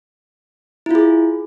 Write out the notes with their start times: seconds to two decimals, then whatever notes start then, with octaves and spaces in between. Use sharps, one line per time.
0.86 E4
0.91 F4
0.95 G#4